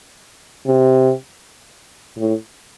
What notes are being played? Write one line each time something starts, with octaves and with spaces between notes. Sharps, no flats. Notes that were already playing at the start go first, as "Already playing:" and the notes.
C3
A2